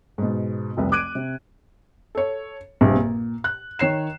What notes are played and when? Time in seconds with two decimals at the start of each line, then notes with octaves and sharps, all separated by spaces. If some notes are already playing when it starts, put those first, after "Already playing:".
0.18 G#2 B2
0.77 F1 C2 B4
0.92 D6 F#6 G#6 D7 D#7
1.15 C3
2.15 A4 C#5
2.81 A#1 G2 C3
2.95 A#2
3.44 F#6
3.79 D#3 C#5 C7 E7